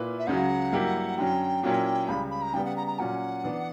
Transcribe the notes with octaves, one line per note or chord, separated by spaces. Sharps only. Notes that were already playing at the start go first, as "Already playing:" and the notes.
Already playing: A#2 A#3 E4 B4
E5
C#2 C#3 F#3 F#5
G2 F#3 A#3 E4 G4
F#2 D3 F#3 C#4 G5
A#2 F#3 A#3 C#4 E4
C#2 C#3 G3 B5
B5
A#5
C#3 G3 B3 G5
F#5
A#5
A#5
A#2 F#3 C#4 F#5
E3 B3 D4